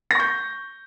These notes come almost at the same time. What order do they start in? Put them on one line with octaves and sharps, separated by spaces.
A#6 C#6 G6